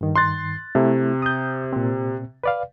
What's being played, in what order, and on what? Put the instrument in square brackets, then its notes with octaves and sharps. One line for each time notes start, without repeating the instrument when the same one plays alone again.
[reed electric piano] G2 D#3
[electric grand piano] C6 F#6 A6
[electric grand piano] C3 [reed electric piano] A3 E4
[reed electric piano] D#6 G6
A#2 C4
B4 D5 F5